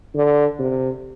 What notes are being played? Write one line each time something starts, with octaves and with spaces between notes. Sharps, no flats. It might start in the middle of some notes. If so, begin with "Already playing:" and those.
D3
C3